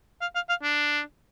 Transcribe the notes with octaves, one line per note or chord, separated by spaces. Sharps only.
F5
F5
F5
D4